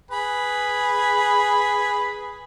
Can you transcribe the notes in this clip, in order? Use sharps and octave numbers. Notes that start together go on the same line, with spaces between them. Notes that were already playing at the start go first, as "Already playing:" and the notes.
G#4 B4 B5